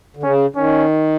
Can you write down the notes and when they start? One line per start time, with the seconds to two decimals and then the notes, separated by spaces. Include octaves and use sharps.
0.17 D3
0.23 C#3 C#4
0.55 D#3 C#4